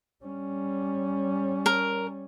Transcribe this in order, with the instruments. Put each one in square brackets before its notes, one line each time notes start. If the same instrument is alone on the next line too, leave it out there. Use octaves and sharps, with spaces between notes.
[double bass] G3 C#4
[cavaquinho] A#4